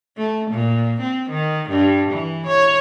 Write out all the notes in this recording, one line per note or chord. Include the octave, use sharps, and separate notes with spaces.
A3
A#2
C4
D#3
G2
E3
C#5